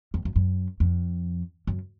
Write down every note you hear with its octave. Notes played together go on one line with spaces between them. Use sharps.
F2
F#2
F#2
F2
F#2